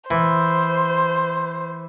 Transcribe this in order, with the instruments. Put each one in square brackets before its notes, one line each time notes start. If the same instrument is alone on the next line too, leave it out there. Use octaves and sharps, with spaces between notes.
[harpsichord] E3 [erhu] C5